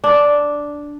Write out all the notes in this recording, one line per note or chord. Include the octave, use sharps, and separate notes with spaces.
D4